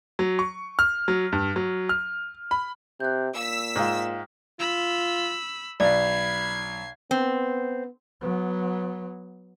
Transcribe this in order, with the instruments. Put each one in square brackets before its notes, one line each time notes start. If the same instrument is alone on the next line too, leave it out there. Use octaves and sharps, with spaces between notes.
[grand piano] F#3
C#6
F6
F#3
G2
F#3
F6
B5
[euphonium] C3 [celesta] F#6 G6
[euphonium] A#2 [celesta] F5 [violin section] E6 B6
[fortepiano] G#2 F4 [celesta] G5 D#6 F6
[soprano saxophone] F4 [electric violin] B5 E6
[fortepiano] B1 [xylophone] D5 [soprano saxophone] B5 [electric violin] G#6 C7
[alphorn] B3 [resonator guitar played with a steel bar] C4
[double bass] F#3 B3